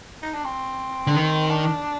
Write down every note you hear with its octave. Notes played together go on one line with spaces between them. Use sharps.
D#4
D4
C4
D3
D#3
D4